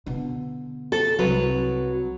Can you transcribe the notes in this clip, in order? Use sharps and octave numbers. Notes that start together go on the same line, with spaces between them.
B2 D3
A4
C2 F#3 B4